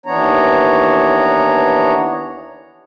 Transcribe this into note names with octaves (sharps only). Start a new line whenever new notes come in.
D#2 E3 B3 D4 C#5 A#5